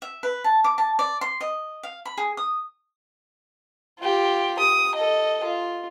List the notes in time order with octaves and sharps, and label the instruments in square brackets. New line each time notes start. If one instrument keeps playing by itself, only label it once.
[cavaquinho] E5
B4
A5
D6
A5
D5
C6
D#5
F5
B5
G#4
D#6
[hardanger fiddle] F4 G4
D#6
A4 D#5
F4